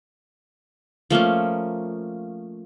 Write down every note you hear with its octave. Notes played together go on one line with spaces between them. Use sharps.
F3 A3 A#3 C#4